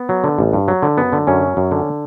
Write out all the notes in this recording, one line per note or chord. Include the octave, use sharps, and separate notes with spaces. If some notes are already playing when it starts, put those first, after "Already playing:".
Already playing: B3
F#3
D3
A1
G2
F#3
D3
F#2 B3
D3
F#2 C#4
F#3
F#2
D3